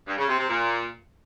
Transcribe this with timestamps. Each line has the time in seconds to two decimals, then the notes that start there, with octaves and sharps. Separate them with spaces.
0.07 G2
0.18 C#3
0.28 C3
0.38 C3
0.49 A#2